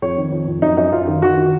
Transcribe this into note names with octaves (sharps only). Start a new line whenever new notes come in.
F2 C#5
D#3
F2
F2
F#2 D#4
F#2 D#4
F#2 F4
D#3
D#3 F#4
D#3